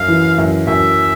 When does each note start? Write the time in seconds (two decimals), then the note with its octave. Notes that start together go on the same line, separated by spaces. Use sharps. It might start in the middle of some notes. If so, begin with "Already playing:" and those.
Already playing: F#2 F5
0.08 E3
0.38 F#2
0.67 F#2 E5